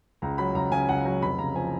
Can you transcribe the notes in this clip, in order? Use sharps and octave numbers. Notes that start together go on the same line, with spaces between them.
C#2 A#5
F#3 B5
C#2 A#5
C#3 G#5
C#2 F#5
F#3
F1 B5
C#3 A#5
F3 G#5